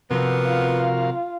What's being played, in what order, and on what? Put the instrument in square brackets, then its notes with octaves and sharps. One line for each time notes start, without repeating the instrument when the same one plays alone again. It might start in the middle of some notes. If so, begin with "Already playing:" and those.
[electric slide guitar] C3 F3 C4 [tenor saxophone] B3 [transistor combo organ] F#4 A#4 F5
[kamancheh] F4